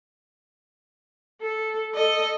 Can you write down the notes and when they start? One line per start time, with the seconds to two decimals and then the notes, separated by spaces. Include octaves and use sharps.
1.42 A4
1.95 A4 D#5